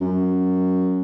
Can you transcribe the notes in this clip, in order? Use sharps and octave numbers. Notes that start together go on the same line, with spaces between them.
F#2